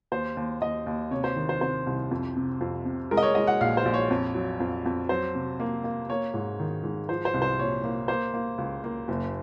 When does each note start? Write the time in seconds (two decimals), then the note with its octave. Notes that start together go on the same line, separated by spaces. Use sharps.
0.12 D#2 C5
0.37 D#2
0.61 D#2 D#5
0.87 D#2
1.11 C3 C#5
1.24 C5
1.36 D#3
1.49 C5
1.61 C3 C5
1.87 C2
2.11 F2
2.37 C3
2.61 F2
2.85 C3
3.11 G#3 A#4
3.17 D#5
3.23 C#5
3.35 G#3 D#5
3.47 F#5
3.61 A#1 F5
3.77 C5
3.85 A#1
3.94 C#5
4.10 F2
4.35 F#3
4.60 F2
4.86 F2
5.09 F#3 C5
5.35 C3
5.60 A#3
5.84 A#3
6.10 A#3 C#5
6.34 G#2
6.60 D#3
6.84 G#2
7.09 F3 C5
7.25 C5
7.34 C2
7.42 C5
7.59 A#2 C#5
7.84 A#3
8.08 A#3 C5
8.34 A#3
8.58 C#2
8.84 A#3
9.08 F#1